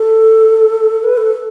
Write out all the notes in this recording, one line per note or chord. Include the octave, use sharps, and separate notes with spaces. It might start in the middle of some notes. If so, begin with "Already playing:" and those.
Already playing: A4
B4
A4